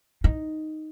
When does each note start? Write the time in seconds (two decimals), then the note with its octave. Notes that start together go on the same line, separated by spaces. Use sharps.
0.24 D#4